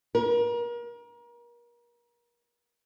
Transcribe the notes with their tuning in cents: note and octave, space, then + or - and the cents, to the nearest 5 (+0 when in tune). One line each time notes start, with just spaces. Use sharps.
A#4 +35